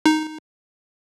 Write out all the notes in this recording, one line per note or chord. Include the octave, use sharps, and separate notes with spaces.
D#4